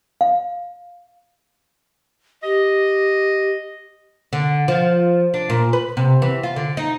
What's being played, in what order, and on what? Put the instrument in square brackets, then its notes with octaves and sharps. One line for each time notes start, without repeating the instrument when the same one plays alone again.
[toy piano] F5
[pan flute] G4 [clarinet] D#5
[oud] D3
F3
D4
A#2
B4
C3
E3
F4
D3
D#4